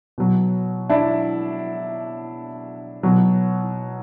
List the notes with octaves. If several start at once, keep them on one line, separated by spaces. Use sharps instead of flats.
B2 F#3
D4 E4
B2 F#3